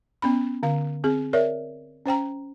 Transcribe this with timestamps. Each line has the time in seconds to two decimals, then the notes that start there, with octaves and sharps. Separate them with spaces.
0.22 B3 C#4 B5
0.63 D3 F5
1.04 C4 G#4
1.33 A#4 C#5 D5 E5
2.06 C#4 C5 G5 A#5